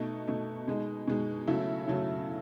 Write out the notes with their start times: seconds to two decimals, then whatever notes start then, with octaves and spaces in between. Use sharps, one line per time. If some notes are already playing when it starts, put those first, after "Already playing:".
Already playing: B2 A3 D#4
0.28 B2 A3 D#4
0.68 B2 G#3 D#4
1.08 B2 G#3 D#4
1.48 C#3 F#3 A3 E4
1.87 C#3 F#3 A3 E4